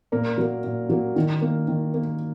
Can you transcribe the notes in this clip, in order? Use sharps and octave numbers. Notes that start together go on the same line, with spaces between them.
A#2 A#3 A#4
F#3 A#3
A#2
F#3 A#3
D#3
A#3
D#3
A#3